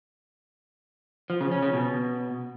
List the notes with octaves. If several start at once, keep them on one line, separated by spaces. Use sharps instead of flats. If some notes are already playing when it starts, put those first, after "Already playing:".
F3
C#3
C#4
C#3
B2